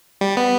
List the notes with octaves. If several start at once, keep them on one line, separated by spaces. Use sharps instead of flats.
G3
B3